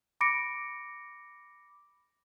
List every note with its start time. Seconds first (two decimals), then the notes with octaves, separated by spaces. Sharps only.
0.21 B5 D6 A#6 C#7 D7